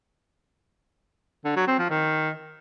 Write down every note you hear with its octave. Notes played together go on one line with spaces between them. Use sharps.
D3
F#3
C4
F3
D#3